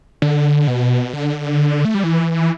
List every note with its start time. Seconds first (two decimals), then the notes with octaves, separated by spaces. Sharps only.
0.22 D3
0.68 B2
1.13 D3
1.85 A3
1.94 G3
2.04 E3